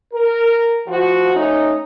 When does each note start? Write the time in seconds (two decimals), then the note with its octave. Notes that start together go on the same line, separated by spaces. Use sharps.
0.13 A#4
0.87 F3 F#4
1.34 A3 C#4 D#4